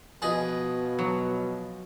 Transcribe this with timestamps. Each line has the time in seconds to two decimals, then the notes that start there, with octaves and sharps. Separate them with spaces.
0.22 B2 F3 G#4 B4 D#5
0.99 F#3